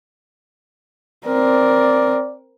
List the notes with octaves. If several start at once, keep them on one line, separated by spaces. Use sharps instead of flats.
C4 A#4 D5